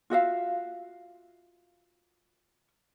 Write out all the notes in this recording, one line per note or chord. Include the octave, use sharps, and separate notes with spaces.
F4 F#4 E5 F5